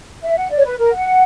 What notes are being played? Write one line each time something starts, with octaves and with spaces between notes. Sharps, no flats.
E5
F#5
D5
C#5
B4
A#4
F#5